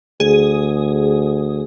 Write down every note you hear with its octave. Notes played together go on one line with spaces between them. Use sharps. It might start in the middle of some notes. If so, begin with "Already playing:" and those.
D2 G#4